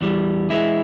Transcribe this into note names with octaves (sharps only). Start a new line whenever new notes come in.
E2 E3 G3
E3 G#3 E4